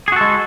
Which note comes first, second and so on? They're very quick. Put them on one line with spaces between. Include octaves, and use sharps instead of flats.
G#4 F#4 A4 G#3